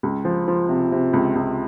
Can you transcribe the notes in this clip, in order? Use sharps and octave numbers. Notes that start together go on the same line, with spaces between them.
C#2
F3
F3
C3
C3
C#2
C#2